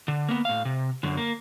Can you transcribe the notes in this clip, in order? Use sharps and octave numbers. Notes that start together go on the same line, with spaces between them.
D3
A#3 B3
A2 F5
C3
F#2 D3
A#3